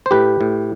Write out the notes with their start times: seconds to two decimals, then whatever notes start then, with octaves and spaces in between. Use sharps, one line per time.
0.06 C5
0.11 A2 G4 B4
0.41 A2